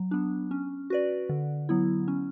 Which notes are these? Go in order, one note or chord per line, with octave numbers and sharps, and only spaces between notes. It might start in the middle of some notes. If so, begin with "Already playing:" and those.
Already playing: F#3
B3 D4
C#4
F#4 B4 D5
D3
F#3 B3 E4
C#4